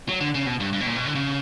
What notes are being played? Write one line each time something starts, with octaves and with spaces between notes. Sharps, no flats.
F#3
D3
C#3
B2
G2
G2
B2
A#2
B2
D3
C#3